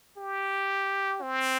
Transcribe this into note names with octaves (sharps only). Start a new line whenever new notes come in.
G4
C4